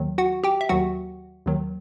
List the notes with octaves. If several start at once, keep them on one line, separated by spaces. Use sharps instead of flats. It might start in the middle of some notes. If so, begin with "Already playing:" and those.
Already playing: D#2 D#3 F#3
F#4 F#5
G4 G5
E5
D#2 D#3 F#3 F#4 F#5
D#2 D#3 F#3